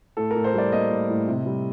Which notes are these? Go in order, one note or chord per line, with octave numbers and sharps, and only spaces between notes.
A2 A4
A2 A#4
C5
G3 D5
A#3 D#5
A2
A2
C3
G3